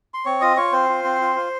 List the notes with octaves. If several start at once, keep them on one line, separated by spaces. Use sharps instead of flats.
C6
C4 C#5 C#6
F4 D#5 D#6
F4 C#5 C#6
C4 C5 C6
F4
C4
F4
F4